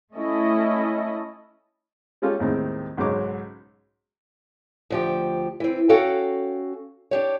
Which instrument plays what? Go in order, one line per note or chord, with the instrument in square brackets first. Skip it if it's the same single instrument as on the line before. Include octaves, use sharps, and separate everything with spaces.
[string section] A3 C#4 E4 A4 D#5
[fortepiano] G3 G#3 C#4 F4 G4 A4
D#2 A2 C3 D#3 G#3 C4
B1 G#2 C#3 F#3 C#5 D6
[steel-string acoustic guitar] D2 F3 G4
E3 C4
C#4 F#4 A4 F5 G5
D4 G4 C#5